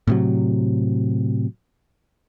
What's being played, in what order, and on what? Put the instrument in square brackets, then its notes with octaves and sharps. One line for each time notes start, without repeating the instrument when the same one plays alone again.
[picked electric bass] A2 C3 F#3